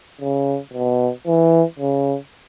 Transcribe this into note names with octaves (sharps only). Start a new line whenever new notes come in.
C#3
B2
E3
C#3